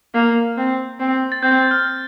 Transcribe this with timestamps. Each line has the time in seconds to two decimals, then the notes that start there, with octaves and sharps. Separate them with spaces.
0.14 A#3
0.57 C4
1.00 C4
1.32 A6
1.43 C4 G6
1.71 F6